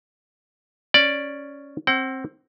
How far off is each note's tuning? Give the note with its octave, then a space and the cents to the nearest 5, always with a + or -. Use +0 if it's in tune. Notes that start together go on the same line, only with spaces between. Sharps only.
C#4 +0 D5 +0
C4 +20 F#5 +45